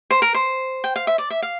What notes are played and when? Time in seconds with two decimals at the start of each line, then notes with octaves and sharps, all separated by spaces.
0.10 C5
0.22 A#4
0.34 C5
0.84 G5
0.96 F5
1.07 E5
1.18 D5
1.30 E5
1.42 F5